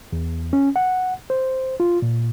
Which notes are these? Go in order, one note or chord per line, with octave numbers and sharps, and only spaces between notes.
E2
C#4
F#5
C5
F4
A#2